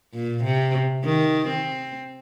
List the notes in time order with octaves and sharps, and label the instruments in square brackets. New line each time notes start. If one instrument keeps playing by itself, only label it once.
[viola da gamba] A#2
C3
D#3
C4